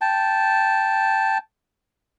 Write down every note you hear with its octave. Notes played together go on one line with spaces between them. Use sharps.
G5 A5